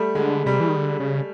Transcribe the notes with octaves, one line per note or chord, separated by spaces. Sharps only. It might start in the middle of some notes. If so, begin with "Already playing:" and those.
Already playing: G3 A3
D3 G#3
C3 G3
E3
D#3
D3
C#3